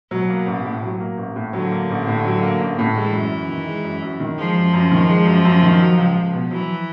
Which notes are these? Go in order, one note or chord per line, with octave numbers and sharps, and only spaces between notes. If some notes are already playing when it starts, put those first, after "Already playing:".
B2 F#3
A#3
A1
A2
F#3
A#3
A1
A2
D3 F#3
A#3
A1
A2
F#3
A#3
A1
A2
E3 G#3
F#2
F#2
D#3
G#3
F#2
F#2
D#3
F3 G#3
F#2
F#2
D#3
G#3
F#2
F#2
D#3
F#3
C#2
C#2
B2
E3 F#3